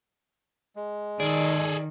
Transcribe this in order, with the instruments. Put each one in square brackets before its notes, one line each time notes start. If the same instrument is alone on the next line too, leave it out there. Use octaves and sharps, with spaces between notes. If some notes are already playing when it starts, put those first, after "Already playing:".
[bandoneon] G#3
[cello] D#3 [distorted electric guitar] G#4 A4 [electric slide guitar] D5